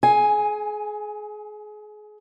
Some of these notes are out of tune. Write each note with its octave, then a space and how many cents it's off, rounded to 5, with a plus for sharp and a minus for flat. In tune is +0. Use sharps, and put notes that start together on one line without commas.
G#4 +30 G#5 +0